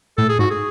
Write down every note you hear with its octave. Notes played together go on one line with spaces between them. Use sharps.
A2 A4
G#4
G#2 F#4
G#4